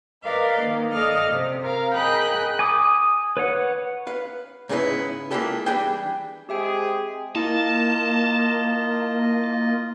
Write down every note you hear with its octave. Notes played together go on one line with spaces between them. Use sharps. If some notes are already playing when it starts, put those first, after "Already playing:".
A#4 B4 D5 D#5 F5
D#3 A#3
A4 D5 D#5 F5 F6
C3
A#4 F5 A#5
G#4 A#4 D#5 G5 B5 F#6
G#5 D6 D#6
B4 C#5 F#5
B4 F5
G#2 C#3 E3 G#3 B3 E4
G#3 A#3 E4 F4 G4 A4
E3 G3 D4 G#4 G5
G#3 C4 G4 G#4 E5 G5
A#3 E4 F4 D#5 A5